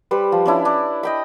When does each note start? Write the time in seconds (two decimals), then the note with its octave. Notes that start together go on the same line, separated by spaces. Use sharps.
0.11 G3 B4 C5
0.32 F3
0.46 C#4 D4 E4
0.65 D4
1.03 D#5 G5 B5